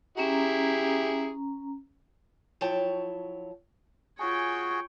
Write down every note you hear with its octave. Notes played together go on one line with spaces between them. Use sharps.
C#4 E4 G4 G#4 A#5
F3 F#3 E4 C#5 G5 A5
F4 F#4 G#4 C#5 G5 G#5